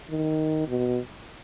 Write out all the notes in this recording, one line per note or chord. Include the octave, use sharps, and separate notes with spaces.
D#3
B2